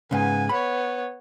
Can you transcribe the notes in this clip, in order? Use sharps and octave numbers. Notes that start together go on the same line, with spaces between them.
G#2 C#3 B3 G#5
B3 C#5 B5